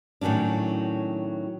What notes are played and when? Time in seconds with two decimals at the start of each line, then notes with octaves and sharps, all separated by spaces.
0.21 A2 D#3 F#3 C#4 D4